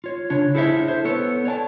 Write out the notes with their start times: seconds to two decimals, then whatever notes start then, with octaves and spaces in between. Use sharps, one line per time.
0.04 F4 C#5
0.30 C#3 D4 C#5
0.55 E4 G#4 A4 C5 D5 E5
0.88 C5
1.05 B3 A4 C#5
1.45 C#5 D5 G#5 A5